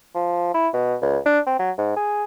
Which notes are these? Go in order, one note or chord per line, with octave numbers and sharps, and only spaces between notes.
F3
E4
B2
C#2
D4
C4
F#3
G#2
G#4